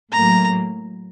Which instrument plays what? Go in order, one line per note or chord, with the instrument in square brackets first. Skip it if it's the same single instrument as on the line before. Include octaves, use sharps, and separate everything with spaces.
[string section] A2 F#3 A#3 [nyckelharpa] A#5